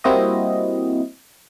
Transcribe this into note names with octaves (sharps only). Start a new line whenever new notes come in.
G3 A#3 C4 E4 F#4 D#5